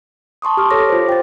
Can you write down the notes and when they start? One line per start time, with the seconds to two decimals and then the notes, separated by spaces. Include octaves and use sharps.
0.42 A5 C6 C#6 D#6
0.57 G4 A5 D6 F6
0.71 A4 C#5 D6 A#6
0.90 F4 C5
1.09 G5 A6